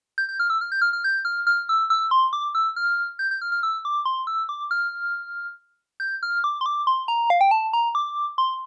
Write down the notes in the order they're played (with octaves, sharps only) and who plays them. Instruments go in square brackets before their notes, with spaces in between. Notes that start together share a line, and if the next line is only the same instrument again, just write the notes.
[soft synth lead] G6
G6
F6
E6
F6
G6
F6
F6
G6
F6
F6
E6
E6
C6
D6
E6
F6
G6
G6
F6
F6
E6
D6
C6
E6
D6
F6
G6
F6
D6
C6
D6
C6
A#5
F5
G5
A5
A#5
D6
C6